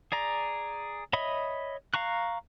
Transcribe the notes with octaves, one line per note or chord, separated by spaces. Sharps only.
G#4 D5 A#5
C#5 D#5 E5 B5 D#6
F5 A#5 C#6 F#6